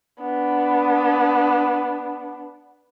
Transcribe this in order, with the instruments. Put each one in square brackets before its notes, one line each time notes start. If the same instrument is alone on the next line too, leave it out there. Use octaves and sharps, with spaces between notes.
[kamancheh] B3 D4